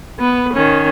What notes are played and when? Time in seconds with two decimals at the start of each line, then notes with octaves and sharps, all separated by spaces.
0.19 B3 B4
0.54 D#3 C#4